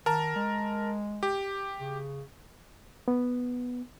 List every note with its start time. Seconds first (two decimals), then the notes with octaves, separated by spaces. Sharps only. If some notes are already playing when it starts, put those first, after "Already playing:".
0.06 D#3 A#4 A5 A#5
0.36 G#3
1.23 G4
1.80 C#3
3.08 B3